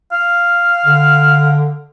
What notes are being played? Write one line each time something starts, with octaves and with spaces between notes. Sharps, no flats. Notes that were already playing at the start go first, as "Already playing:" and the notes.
F5
D3